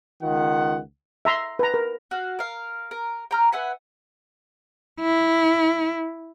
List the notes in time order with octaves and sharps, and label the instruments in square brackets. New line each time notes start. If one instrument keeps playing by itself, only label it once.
[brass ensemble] C#2 D#3 F4 F#5
[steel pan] E5 A#5 C6
B4 A#5
A#4
[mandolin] F#4 F5
A#4 F5
A#4
G5 A#5 F6
B4 E5 F#5 G#5
[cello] E4